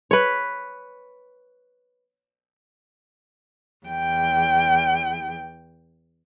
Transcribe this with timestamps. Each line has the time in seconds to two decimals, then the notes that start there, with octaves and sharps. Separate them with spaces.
0.11 B4 C#5
3.86 E2 G5